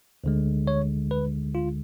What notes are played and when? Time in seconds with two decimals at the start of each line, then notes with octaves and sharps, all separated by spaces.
0.24 D2 D3 G#3
0.67 C#5
1.11 B4
1.55 F4